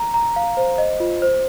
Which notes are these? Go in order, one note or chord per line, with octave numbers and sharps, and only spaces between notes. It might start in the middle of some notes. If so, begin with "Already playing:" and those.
Already playing: A#5
A#5
F5
C5
D#5
F4
C5